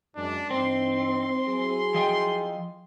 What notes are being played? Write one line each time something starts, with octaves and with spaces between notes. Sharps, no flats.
F#2 G#3 D4
G2 E3 C4 D#4 C6
F#3 E4 G#4
F3 D#5 G5